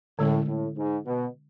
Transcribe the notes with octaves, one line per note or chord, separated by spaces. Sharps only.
A2 D3 G#3 C#4
A2
G#2
B2